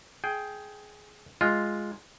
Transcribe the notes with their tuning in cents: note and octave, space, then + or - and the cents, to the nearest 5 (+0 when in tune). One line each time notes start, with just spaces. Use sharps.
G#4 +15 G5 +0
G#3 +0 F4 +0